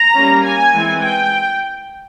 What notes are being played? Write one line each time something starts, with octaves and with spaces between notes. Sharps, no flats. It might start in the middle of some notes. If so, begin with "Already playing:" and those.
Already playing: A#5
G3 A#3 C#4
G#5
E3 G#3 C4
G5